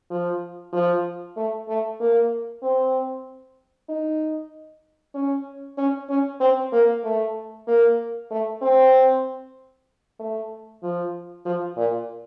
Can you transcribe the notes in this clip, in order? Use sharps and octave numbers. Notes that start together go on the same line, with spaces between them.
F3
F3
A3
A3
A#3
C4
D#4
C#4
C#4
C#4
C4
A#3
A3
A#3
A3
C4
A3
F3
F3
A#2